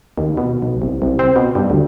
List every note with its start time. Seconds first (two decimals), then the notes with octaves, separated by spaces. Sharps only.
0.18 D#2
0.37 B2
0.62 B1
0.82 C2
1.02 C2
1.19 C4
1.36 B2
1.55 G2
1.70 D2